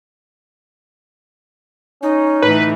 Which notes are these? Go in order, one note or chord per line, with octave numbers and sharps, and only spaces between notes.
C#4 D#4
A2 D3 E3 B4